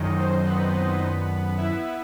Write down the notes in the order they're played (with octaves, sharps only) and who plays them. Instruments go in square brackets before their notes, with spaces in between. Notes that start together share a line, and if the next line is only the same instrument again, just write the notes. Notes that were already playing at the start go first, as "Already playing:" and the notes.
Already playing: [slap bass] F#2 D#3 F#3 [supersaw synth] D#4 D#5
[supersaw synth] C4 C5
B3 B4
E4 E5